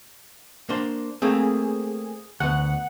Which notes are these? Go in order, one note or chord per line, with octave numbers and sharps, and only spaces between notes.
A#3 D4 C5
A3 A#3 C4 G#4
D2 B3 F#5